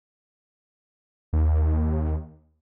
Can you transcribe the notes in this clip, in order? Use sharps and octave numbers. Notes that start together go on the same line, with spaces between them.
D#2